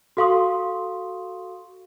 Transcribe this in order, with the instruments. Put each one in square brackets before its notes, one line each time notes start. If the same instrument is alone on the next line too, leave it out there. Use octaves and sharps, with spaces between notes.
[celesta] F#4 A4 F5 C6 C#6 D#6